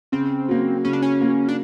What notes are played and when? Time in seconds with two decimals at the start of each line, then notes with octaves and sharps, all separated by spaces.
0.12 C#3 C4
0.48 F#3 A#3
0.85 C#3 C#4
0.93 D4
1.02 C#4
1.21 F#3 A#3
1.48 D4